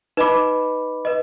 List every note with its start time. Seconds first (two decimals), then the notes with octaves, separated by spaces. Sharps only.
0.17 D#4 B4 D#5 B5 D6
1.05 B4 D#5